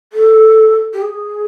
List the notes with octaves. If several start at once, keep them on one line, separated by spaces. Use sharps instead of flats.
A4
G4
G#4